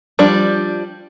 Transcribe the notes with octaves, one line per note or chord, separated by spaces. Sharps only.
F3 G3 D4